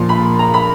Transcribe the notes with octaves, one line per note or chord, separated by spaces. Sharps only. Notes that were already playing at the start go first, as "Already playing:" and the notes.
Already playing: A#2 F3 C6
B5
A#5
B5